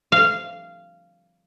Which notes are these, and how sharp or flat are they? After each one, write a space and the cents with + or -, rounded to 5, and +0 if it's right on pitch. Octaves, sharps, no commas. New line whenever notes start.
F5 -15